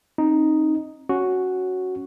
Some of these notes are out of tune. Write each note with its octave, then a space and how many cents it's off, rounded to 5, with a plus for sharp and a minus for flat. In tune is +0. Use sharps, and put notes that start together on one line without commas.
C4 +40 D#4 +0
C#4 +0 F#4 +0 C#5 -5